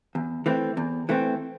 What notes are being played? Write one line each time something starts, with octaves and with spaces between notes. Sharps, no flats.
E2
E3 A3 C4
E2
E3 A3 C4